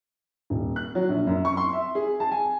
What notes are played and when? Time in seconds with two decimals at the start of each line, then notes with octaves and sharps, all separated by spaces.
0.50 D#1
0.76 F#6
0.95 F#3
1.09 A#1
1.27 F#2
1.45 C#6
1.57 C6
1.73 E5
1.95 G#4
2.20 A5
2.31 G#5